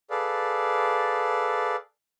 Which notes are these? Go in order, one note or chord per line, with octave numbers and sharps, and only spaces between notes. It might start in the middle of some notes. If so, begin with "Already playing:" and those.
G#4 A4 B4 D5 F5